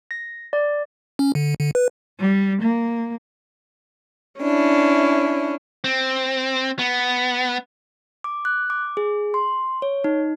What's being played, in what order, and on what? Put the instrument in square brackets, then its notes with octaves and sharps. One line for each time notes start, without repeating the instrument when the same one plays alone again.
[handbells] A#6
D5
[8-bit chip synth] C#4
D3
D3
B4
[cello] G3
A#3
[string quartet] C#4 D4 E4
[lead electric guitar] C4
B3
[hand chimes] D6
F#6
D6
G#4
C6
C#5
D#4